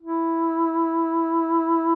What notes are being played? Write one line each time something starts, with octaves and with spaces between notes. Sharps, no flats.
E4